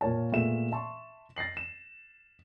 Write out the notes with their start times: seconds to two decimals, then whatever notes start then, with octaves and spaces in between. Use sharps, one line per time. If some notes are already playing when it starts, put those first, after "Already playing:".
0.01 A#2 A#3 C#5 A5
0.32 A#2 A3 B3 G#4 E5 E7
0.72 E5 A5 C6 C#6
1.36 A6 A#6 C7 F#7
1.57 E7